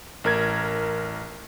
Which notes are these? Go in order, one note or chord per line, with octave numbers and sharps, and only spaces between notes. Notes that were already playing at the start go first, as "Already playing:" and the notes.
A1 A#4 G#6